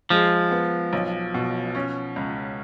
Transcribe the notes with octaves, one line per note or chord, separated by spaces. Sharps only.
F3 G#3
B3
B1
B2
C#4
C#2